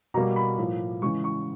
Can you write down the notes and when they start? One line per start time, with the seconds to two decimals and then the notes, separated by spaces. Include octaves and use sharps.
0.14 B2 G3 A#3 A#5
0.36 B5
0.58 A2 F3 A#3
1.02 C#3 E3 G#3 C#6
1.24 C#6